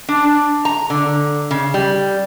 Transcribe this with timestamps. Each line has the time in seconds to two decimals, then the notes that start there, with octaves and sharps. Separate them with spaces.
0.09 D4
0.65 A#5
0.90 D3
1.51 C#3
1.74 G3